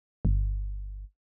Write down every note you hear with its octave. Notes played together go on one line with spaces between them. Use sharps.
G1